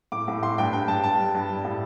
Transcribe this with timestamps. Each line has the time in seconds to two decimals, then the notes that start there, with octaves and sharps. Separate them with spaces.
0.12 A2 D6
0.28 A2
0.43 A2 C6
0.58 G2 G5
0.73 G2 G5
0.88 G2 A5
1.03 G2 A5
1.18 G3
1.34 G2
1.49 G3
1.65 A2